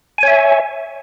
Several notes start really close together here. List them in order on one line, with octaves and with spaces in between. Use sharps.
G#5 C#5 E5